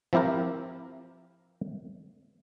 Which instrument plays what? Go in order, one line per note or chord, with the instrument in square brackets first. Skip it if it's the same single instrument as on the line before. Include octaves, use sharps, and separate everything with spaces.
[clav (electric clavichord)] F3 C4 E4 G4 A#4